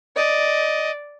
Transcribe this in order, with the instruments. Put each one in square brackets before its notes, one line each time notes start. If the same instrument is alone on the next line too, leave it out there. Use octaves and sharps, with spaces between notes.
[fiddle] D5 [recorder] D#5